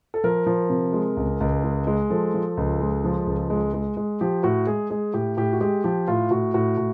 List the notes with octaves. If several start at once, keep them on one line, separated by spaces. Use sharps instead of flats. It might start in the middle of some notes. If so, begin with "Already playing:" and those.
A4
F3 A#4
F3
C3
G#3
C#2
C#2
G#3
G#3
F3 A4
F3
C#2
G#3
F3
C#2
G#3
G#3
G#3
F3 G4
A2 F#4
G#3 G#4
G#3 G#4
A2 G4
A2 G4
F#4
G#3 G4
F3 G4
A2 F4
A2 F#4
A2 F#4
A2